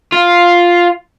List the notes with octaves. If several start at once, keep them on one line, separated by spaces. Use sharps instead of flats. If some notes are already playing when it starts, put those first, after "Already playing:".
F4